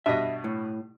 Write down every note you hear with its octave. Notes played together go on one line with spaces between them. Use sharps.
G2 B2 D4 D#5 E5
A2